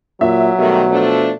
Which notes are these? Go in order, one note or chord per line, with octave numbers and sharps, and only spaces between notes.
A#2 F#3 E5
B2 D#3 G3 A3
F3 A3 D4